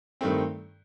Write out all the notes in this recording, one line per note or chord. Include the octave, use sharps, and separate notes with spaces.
G2 D#3 A3 C4